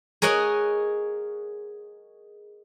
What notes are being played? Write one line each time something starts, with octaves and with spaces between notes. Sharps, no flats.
G#4 A#4 C#5 D#5 F#5